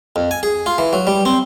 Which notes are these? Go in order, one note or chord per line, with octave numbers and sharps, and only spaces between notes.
F2
G#5
G#4
F4
E3
F#3
G3
C4